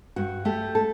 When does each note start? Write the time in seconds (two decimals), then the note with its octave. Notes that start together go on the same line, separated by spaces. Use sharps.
0.16 G2 F#4
0.45 A3 G4
0.75 A4